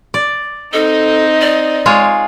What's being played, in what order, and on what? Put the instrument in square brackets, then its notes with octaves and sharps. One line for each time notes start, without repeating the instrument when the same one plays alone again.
[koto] D5
[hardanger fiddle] C4 D#4 [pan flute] A4 [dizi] D#5
[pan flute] D5
[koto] G#3 F4 C#5